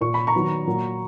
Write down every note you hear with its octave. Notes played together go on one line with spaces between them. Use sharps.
A#2 A#3 C#6
B5
A#5 C#6
D#3 F#3 B3
A#2 F#3 A#3